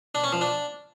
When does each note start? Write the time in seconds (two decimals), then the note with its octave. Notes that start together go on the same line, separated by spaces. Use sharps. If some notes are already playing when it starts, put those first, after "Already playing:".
0.15 D4
0.24 C#4
0.32 F3
0.41 D4